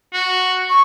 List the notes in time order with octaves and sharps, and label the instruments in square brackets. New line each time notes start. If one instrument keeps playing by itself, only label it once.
[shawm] F#4
[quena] C#6